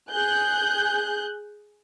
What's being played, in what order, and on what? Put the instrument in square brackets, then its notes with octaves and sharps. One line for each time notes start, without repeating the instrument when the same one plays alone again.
[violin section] G#4 F#6 G6